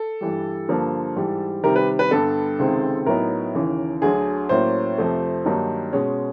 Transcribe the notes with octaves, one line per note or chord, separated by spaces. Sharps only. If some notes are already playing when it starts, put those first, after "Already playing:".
Already playing: A4
G2 E3 G3
G2 D3 F3 A#3
G#2 E3 G3
C3 D#3 G3 A#4
B4
B4
G2 D3 G3 B3 A4
C#2 C3 D#3 G#3 C4
A2 F#3 B3 D#4 A#4
D#2 C#3 E3
D2 D3 F#3 G#4
A2 F#3 A#3 C#4 C5
F2 C3 F3 A3
G2 D#3 F#3 A#3 D#4
B2 G#3 C#4